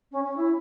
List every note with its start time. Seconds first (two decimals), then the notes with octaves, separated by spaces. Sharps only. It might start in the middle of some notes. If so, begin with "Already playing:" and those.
0.11 C#4
0.23 C#4
0.36 E4